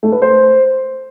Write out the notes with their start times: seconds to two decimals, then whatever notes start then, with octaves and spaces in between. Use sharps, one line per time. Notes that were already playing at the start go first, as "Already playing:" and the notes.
0.03 A3
0.12 B4
0.22 C5